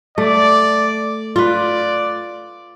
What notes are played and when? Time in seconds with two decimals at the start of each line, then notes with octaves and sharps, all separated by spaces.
0.18 A3 D5
1.36 F4 B4 D5